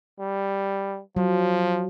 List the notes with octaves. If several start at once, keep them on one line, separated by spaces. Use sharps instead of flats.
G3
F3 F#3